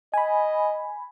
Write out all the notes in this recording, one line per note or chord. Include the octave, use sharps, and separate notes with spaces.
D#5 G#5 B5